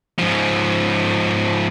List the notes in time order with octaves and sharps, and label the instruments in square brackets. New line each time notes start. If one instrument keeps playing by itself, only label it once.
[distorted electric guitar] G#2 F3